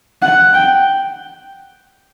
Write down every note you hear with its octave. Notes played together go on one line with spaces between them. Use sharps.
F#5
G5